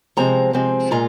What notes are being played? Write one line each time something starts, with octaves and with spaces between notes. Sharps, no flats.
C3 F3 G#3 C4 A#5
C3 F3 G#3 C4
A#2 G#3 F4 A#5